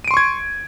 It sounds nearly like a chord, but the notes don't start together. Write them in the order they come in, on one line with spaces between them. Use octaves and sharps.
D#7 D7 C6 C#6 G#6